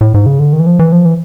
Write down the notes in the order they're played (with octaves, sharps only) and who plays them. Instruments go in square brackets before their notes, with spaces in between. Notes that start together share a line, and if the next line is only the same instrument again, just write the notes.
[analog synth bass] A2
G#2
C#3
D3
D#3
E3
F3
E3
F3
E3